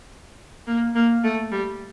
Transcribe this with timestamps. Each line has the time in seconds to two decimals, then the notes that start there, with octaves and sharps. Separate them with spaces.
0.67 A#3
0.95 A#3
1.24 A3
1.52 G3